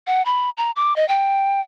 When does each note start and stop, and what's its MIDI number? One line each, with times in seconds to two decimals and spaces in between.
0.07 0.24 78
0.25 0.50 83
0.57 0.71 82
0.76 0.96 86
0.96 1.07 75
1.08 1.61 79